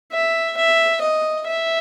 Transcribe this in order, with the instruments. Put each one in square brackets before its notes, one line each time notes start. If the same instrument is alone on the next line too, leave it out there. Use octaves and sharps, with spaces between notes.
[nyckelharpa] E5
E5
D#5
E5